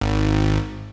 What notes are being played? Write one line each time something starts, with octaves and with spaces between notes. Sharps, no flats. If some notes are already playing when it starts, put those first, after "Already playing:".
G#1